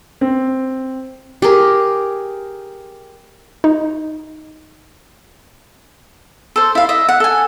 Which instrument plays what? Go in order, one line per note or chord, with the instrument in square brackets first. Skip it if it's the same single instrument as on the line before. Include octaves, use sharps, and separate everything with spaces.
[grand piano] C4
[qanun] G4 G#4 A#4
[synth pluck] D#4
[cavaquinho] A4 C5
E4 F5
D#5 E5
F#5
A4 G#5